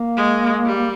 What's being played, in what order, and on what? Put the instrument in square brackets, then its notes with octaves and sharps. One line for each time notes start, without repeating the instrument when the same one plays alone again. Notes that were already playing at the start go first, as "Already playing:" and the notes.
Already playing: [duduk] A#3
[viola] G#3
G3